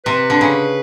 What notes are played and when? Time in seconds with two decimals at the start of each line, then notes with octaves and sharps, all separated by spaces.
0.06 C3 B4
0.30 D3
0.41 C#3